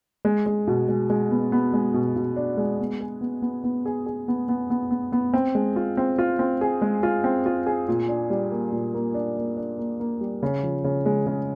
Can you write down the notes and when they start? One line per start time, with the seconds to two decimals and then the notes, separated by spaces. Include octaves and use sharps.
0.25 G#3
0.46 G#3
0.68 B2
0.89 G#3
1.10 G#3
1.31 B3
1.52 B3
1.73 G#3
1.94 B2
2.16 B2
2.36 D4
2.57 G#3
2.80 B3
3.01 G#4
3.21 B3
3.42 B3
3.64 B3
3.86 G#4
4.06 G#4
4.28 B3
4.49 B3
4.70 B3
4.91 B3
5.12 B3
5.34 C4
5.55 G#3
5.76 F4
5.97 C4
6.19 F4
6.39 C4
6.61 G#4
6.82 G#3
7.03 F4
7.24 C4
7.46 F4
7.66 G#4
7.88 A#2
8.09 D4
8.30 G3
8.51 A#3
8.72 A#2
8.94 A#3
9.14 D4
9.37 A#3
9.57 D4
9.78 A#3
10.00 A#3
10.21 G3
10.43 C#3
10.63 F3
10.84 C#3
11.06 G#3
11.27 C#3